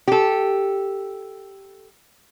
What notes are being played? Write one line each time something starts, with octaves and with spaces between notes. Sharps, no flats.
G4 A4